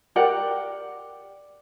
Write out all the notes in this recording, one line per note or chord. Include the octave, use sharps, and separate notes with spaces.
G4 A#4 D5 F#5